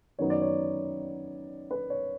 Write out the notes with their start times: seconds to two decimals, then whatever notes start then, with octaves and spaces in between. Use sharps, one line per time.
0.19 F#2 D#3 F#3 B3 D#4 C#5
0.30 D5
0.42 C#5
1.71 B4
1.90 C#5